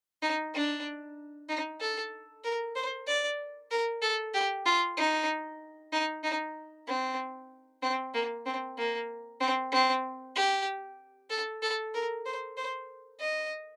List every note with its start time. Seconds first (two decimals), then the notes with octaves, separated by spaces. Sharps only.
0.22 D#4
0.54 D4
1.49 D#4
1.80 A4
2.44 A#4
2.76 C5
3.07 D5
3.71 A#4
4.02 A4
4.34 G4
4.66 F4
4.97 D#4
5.92 D#4
6.24 D#4
6.87 C4
7.82 C4
8.14 A#3
8.46 C4
8.78 A#3
9.41 C4
9.72 C4
10.36 G4
11.30 A4
11.62 A4
11.94 A#4
12.26 C5
12.57 C5
13.20 D#5